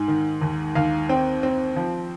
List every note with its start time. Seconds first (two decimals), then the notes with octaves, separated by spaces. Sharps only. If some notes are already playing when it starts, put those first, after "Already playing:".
Already playing: G#2 G#5
0.08 D#3
0.41 D#2
0.75 D#2 F5
1.09 C4 G5
1.43 C4
1.76 F3